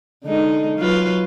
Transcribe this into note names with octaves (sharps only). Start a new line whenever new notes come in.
D3 G#3 D#4
F#3 F4 B4